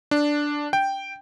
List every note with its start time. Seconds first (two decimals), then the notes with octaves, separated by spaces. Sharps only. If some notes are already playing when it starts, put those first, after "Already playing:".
0.11 D4
0.73 G5